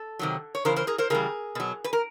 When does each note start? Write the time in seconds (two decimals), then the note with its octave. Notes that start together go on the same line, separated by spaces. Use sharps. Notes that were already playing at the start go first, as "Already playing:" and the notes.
Already playing: A4
0.19 C3 D#3 F#3
0.55 C#5
0.65 C#3 E3 A#4 C5
0.76 A#4 C5
0.87 G#4 A#4
0.98 A#4 C5
1.10 C#3 E3 G3 G#4 A#4
1.55 B2 F#3
1.84 B4
1.93 A#4